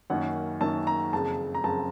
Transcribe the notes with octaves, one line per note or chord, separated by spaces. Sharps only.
F#2 D#3 A#3 C#4 F#5
F#2 D#3 A#3 C#4 A5
A#5
F#1 F2 C#3 A5
A#5
F#1 F2 C#3 A5